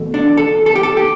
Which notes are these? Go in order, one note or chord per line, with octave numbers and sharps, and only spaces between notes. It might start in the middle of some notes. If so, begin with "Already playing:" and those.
Already playing: E2 B2 A3
D4
A4
A4
G4
A4
G4